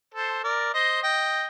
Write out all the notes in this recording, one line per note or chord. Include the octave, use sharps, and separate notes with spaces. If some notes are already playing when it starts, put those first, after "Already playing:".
A4 C5
A#4 D5
C5 D#5
D#5 G5